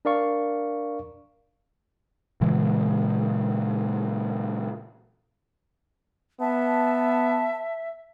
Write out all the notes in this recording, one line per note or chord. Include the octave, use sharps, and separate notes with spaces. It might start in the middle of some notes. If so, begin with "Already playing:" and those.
D4 A#4 D5 F5 C#6
A#2 C#3 E3 G#3
B3 E5 A5